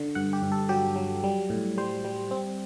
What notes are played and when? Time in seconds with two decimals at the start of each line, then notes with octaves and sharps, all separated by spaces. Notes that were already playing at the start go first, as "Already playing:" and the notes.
Already playing: D3
0.15 G2 F#5
0.33 G4
0.43 G2
0.52 A4
0.69 F#3 G4
0.96 F#3
1.24 G3
1.50 A2
1.78 G3 C5
2.05 G3
2.31 C4